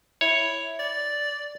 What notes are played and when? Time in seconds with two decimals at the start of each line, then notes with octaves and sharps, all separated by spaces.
0.21 E4 C#5
0.79 D5